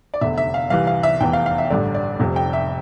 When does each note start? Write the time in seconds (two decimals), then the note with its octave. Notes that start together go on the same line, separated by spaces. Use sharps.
0.14 D5
0.21 F1 E2 D3 E5
0.38 E5
0.54 F5
0.70 C2 C3 E3 F5
0.87 F5
1.03 E5
1.20 F1 E2 E3 G5
1.33 F5
1.46 F5
1.58 E5
1.70 A1 G2 D3 D5
1.94 D5
2.20 F1 F2 C3
2.36 G5
2.53 E5